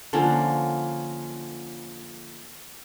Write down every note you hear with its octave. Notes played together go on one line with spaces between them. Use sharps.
D3 F3 A#3 C#4